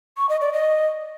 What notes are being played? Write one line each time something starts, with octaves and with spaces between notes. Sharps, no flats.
C#6
D#5
D5
D#5